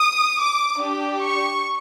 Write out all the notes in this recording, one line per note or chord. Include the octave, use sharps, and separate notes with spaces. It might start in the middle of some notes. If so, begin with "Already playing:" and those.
Already playing: D#6
D6
D4 G4
C#6